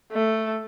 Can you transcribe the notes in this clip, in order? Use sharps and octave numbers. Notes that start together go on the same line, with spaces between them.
A3